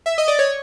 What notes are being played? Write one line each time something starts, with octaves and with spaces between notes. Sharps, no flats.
E5
D#5
D5
C#5